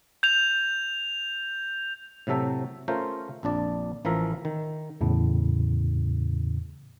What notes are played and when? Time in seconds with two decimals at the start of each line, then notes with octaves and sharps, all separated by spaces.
0.23 G6 F7
2.27 A2 C3 F#3 A4 E5
2.88 A3 C#4 F4 A#4 C5
3.43 A#1 F2 D4 D5
4.05 A1 E3 F3 A#4 E5
4.45 D#3
5.01 E2 A2 C#3